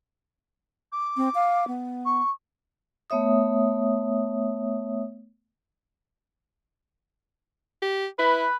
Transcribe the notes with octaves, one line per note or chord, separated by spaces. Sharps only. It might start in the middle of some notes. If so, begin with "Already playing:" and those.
D6
C4
F5
B3
C#6
A3 B3 C#5 E5 D#6
G4
E4 B4